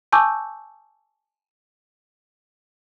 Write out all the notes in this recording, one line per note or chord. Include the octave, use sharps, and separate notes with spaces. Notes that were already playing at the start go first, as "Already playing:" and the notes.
G#5 A5 C#6 D6 E6 G6